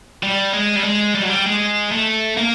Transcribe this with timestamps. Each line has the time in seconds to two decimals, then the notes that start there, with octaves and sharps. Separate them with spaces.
0.23 G3
0.54 G#3
0.76 G3
0.85 G#3
1.15 G3
1.22 F#3
1.29 G3
1.46 G#3
1.92 A3
2.37 A#3